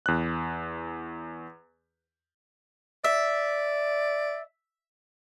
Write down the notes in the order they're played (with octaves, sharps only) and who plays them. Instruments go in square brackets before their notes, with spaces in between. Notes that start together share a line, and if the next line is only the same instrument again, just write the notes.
[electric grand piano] E2 F#6
[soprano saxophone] D5 [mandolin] E5